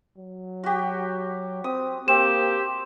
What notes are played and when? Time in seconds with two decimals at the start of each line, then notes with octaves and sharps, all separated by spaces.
0.18 F#3
0.63 F#4 G4
1.64 C4 D#6
2.08 A#3 C4 G4 E7